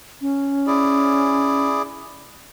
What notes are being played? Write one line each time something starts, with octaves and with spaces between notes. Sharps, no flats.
C#4
E4 G#4 D5